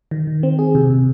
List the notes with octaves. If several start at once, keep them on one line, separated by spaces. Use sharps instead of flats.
D#3
D#3
C4
G#4
C3
C3